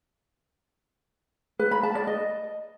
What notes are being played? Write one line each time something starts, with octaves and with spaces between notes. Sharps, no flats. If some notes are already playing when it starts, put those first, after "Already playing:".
B4
B5
A5
D5
D#5